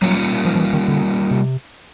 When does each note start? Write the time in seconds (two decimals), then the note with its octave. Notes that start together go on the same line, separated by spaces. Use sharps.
0.02 F#3 G3 A#3 C#4 F4
0.45 F3
0.55 F3
0.60 E3
0.73 D#3
0.88 D3
1.31 C3